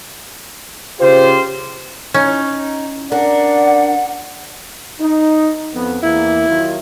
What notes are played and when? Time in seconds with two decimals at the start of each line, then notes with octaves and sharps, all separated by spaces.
1.00 C#3 F4 G4 C5
2.14 C#4 D#4
3.12 D4 A#4 D5 F#5
5.00 D#4
5.73 F2 B3
6.03 E2 A#3 E4
6.48 D#3 F#3 F4